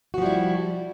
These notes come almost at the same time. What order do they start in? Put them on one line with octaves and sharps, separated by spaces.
F#4 F3 G3 E4